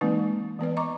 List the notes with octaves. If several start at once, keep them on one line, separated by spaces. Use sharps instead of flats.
E3 G#3 A#3 C4 D#4 B4
E3 B3 B4 D5
D#5 A#5 C#6 D6